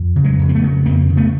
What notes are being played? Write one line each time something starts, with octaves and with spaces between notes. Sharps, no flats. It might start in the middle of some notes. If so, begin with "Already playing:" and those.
Already playing: F2
C#3
F#3 G#3
F2
C4
A3 B3
C#3
F2 A#3 C4
C#3
A3 B3